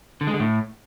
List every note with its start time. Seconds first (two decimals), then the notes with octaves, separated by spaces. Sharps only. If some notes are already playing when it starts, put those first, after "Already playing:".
0.21 D3
0.27 G#3
0.34 D3
0.40 A2